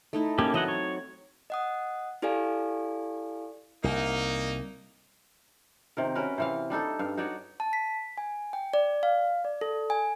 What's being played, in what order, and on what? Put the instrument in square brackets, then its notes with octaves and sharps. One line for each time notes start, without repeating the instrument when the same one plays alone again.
[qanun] A3 D#4 E4
[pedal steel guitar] A#3 C#4 G4 [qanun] A5
[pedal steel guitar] E3 D#5 F#5 [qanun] F#3 C4
[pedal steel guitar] C#5
[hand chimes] D#5 F#5 D#6
E4 G4 A4 D5 F5 G#5
[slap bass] C2 [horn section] A#3 D#4
[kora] C3 D#3 A#4
C#4 F#4 A#4 B4
C3 E3 F5
G3 D4 D#4 A4
G2 F5
D#4 F#4 C#5 D5
[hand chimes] A5
B6
G#5
G5
D5
F5
D5
A4
G#5